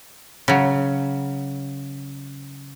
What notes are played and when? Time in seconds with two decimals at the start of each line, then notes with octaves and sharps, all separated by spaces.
0.48 C#3 F#3